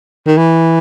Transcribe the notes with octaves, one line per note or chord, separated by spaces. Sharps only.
D#3
E3